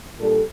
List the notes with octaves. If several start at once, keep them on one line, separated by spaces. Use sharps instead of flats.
A#2 G3 D4 A4